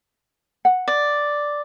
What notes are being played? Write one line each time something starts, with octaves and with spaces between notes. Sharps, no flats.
F#5
D5